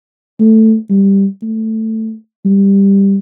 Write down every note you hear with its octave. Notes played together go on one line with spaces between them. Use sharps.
A3
G3
A3
G3